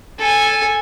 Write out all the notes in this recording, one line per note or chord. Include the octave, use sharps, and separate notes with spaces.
A4 G#5